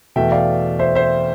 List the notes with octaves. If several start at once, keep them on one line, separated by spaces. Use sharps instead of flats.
E2 B2 A3 E5 G5
D5 F5
C5 E5
C5 E5